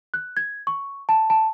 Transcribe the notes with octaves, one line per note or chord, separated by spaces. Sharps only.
F#6
G#6
C#6
A5
A5